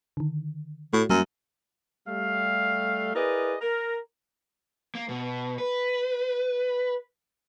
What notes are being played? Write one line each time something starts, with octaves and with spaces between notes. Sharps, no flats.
D3 D#3
A2 A3 F#4
F#2 F#3 G3 A#3
G3 A3 F5
E4 G#4 A#4 B4 D5 D#5
A#4
A#3
B2
B4